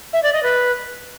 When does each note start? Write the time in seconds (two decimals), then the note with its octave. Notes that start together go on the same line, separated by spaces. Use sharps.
0.13 E5
0.23 D5
0.33 D#5
0.43 B4